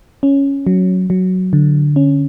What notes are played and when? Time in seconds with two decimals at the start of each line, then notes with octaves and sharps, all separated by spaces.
0.23 C#4
0.67 F#3
1.10 F#3
1.53 D3
1.96 C#4